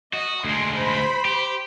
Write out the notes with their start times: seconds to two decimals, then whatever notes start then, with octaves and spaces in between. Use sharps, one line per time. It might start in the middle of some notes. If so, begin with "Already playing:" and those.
0.13 F#4 D#5
0.44 D2 G#3 C6
0.76 C5 B5
1.25 G4